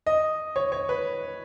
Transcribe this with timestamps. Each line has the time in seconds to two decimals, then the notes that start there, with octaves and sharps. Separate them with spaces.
0.06 D#5
0.56 C#5
0.72 C#5
0.89 B4